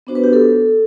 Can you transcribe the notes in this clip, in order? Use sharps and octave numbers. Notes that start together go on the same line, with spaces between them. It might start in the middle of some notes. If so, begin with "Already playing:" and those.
B3 D4 F#4 C5
B4
G4
A4